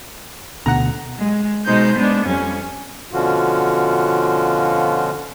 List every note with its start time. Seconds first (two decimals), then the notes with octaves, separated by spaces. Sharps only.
0.66 D2 B2 D3 F#5 A#5
1.19 G#3
1.65 B2 G#3 D#4 C5 G6
1.95 G#3 B3 D4
2.25 F2 G3 C#4
3.13 B2 D3 F3 C#4 F4 F#4